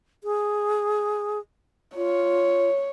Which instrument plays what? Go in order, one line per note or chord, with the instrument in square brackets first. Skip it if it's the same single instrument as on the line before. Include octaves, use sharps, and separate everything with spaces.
[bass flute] G#4
[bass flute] F4 [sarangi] C#5